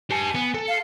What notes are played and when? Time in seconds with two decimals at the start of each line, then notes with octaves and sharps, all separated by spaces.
0.11 G4 G#5 A5
0.35 B3
0.54 A4
0.68 F5